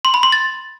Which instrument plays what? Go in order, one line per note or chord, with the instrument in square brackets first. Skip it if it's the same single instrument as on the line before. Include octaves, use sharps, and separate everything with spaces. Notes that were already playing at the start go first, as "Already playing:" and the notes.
[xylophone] C6
B5
C6
A6